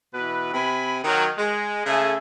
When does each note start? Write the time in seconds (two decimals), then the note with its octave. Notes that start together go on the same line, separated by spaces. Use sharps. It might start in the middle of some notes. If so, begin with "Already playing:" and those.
0.14 B2 E3 B4
0.54 C3 G#5 B5
1.04 D#3 F#3
1.38 G#3
1.86 C#3 A3 G#4 A4 G#5